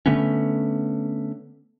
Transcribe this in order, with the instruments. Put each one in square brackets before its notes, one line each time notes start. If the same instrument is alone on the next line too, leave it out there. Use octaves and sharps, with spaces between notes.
[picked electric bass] D3 A3 B3 C#4